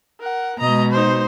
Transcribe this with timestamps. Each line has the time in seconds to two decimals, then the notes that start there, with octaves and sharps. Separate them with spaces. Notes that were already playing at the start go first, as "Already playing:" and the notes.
0.20 A#4 F#5
0.60 B2 G#3 D#5 A#5
0.91 D#4 C5